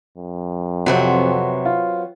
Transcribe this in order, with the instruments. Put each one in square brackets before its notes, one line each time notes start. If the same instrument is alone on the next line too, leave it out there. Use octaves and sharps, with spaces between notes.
[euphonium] F2
[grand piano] C3 [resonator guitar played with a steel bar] F#3 B3 C4
[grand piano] F4